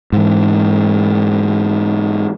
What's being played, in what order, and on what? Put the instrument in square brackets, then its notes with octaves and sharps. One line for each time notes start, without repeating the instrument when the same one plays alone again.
[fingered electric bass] G#2 E3